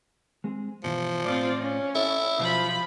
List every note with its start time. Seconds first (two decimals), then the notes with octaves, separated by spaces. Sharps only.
0.44 G#3 C4 G#4
0.83 G2 B2 E3 F3
1.24 A2 C4 F4 D5
1.62 C#4
1.95 E4 A4
2.39 B1 F3 B5